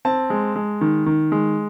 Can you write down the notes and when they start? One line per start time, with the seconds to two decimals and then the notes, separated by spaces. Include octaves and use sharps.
0.05 C4 A5
0.30 G#3
0.56 G#3
0.81 D#3
1.06 D#3
1.32 G#3